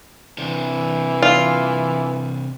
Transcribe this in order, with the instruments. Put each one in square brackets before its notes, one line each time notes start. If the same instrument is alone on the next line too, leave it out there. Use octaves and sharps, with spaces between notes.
[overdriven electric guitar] C3 D4 [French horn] E3
[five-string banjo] F4